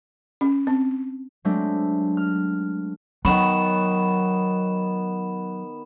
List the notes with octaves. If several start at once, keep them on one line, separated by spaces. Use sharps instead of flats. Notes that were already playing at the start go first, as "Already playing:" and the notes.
C#4
C4
F#3 G#3 A3 C4 D4
F6
D#3 F#3 B3 C#5 B5 E7